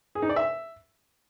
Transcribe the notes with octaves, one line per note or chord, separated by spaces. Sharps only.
G#4
D#4
D5
E5